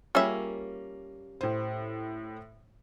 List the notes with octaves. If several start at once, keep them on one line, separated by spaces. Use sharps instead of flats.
G3 A#3 C#4 F4 G#4 E5
A2 C5